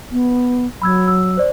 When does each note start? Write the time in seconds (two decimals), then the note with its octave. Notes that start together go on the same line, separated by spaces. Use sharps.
0.12 B3
0.82 F#3 B5 E6 G#6
1.08 E6
1.37 C5 D5